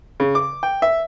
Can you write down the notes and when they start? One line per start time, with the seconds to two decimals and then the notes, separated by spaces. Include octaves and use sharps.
0.20 C#3
0.35 D6
0.63 G5
0.82 E5